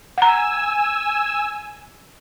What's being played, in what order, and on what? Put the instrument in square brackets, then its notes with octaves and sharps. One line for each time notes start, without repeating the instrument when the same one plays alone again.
[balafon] F#5 A#5 [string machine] G#5 E6